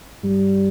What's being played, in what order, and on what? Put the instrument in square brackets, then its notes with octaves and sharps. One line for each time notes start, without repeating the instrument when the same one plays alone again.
[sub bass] G2 [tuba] G3